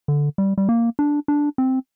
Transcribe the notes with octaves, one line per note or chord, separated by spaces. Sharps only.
D3
G3
G3
A#3
D4
D4
C4